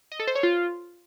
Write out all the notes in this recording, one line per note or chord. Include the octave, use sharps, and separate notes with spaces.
D#5
A4
C5
C#5
F4